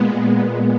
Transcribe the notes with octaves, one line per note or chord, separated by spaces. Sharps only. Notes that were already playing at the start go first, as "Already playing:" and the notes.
Already playing: A#2 G#3 B3